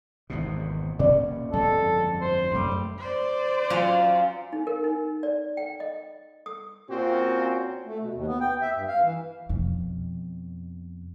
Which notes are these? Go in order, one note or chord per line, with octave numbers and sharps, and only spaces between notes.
G#1 E2 B2
A#2 C#4 D5
G1 F2 G#3 A4
C5
F#2 G3 A3
C5 D5
F#3 C#4 F4
D#4
A#4
D#4
D5
G5
D#5
D#6
A#2 C4 C#4 F4 F#4
A3
B2
D#2
B3
G5
E5
G2
F5
E3
F2 B2